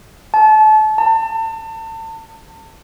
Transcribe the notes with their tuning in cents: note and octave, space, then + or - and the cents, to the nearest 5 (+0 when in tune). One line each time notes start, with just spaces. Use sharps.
A5 -30
A5 +35